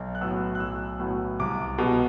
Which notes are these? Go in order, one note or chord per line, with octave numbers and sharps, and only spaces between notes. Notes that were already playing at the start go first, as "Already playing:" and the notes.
Already playing: B1
F#6
A2 F#3 B3 E6
F#6
B1 E6
A2 F#3 B3
C2 D6
B2 G3 B3